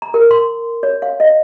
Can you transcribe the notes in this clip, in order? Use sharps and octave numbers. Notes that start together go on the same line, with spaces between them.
A#5
A#4
C6
C#5
F5
D#5